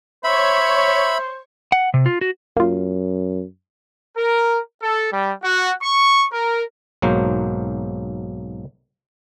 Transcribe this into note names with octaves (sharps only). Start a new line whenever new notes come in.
C5 C#5 E5 B5 C#6
F#5
C3
F4
F#4
F#2 A#3 F4
A#4
A4
G3
F#4
C#6
A#4
B1 G#2 F#3 A#3 C5